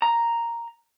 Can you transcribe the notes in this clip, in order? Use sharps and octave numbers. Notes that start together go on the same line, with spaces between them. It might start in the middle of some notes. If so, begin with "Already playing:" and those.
A#5